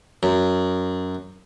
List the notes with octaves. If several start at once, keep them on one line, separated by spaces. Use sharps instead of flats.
F#2